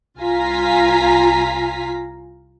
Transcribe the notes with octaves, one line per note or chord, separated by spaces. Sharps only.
C2 F4 F5 G#5 A#5 B6